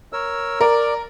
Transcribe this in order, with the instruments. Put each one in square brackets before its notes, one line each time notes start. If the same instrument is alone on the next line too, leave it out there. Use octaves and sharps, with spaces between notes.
[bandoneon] A#4 C#5 E6
[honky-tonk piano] A#4 [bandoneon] D5